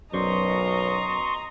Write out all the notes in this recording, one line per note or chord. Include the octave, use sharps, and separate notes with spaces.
B1 F#2 C5 D5 D#5 A#5 C6 C#6